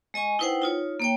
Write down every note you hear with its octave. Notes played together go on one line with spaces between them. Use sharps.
G#3 D#5 G#5 C#6
D#4 E4 B4 C5 F#5 G5
D#4 F4 C#5
A#3 C#5 G5